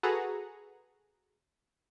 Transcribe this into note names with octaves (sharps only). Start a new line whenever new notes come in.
F#4 G#4 A4 B4 F#5 A#5